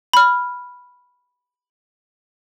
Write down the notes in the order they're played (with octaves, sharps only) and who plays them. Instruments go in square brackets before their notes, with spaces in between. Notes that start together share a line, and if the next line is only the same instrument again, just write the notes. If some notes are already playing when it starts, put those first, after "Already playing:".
[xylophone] B5 F6